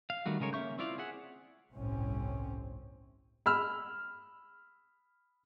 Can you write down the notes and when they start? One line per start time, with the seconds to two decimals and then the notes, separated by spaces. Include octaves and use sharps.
0.10 F5
0.26 D#3 G3 A3 F#4
0.40 C#3 G#3 A#4 C#5
0.53 A#3 C#4 E5 C#6 G6
0.78 C4 E4 F4 D5 F5
0.98 G#4 E5 F#5
1.75 G1 C2 A2 C3 C4 C#4
3.46 B5 E6 F6